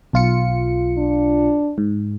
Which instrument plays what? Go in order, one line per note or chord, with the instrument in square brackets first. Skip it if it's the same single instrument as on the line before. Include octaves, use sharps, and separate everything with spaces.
[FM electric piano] B1 F4 C#7
[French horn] D4
[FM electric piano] G#2